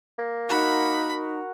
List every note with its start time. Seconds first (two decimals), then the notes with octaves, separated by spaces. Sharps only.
0.19 A#3
0.49 D#4 F#4 A#4 F#5 B5